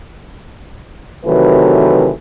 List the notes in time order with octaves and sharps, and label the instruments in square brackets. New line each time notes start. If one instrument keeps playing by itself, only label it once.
[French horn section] C3 D#3 E3 F#3 A3 B4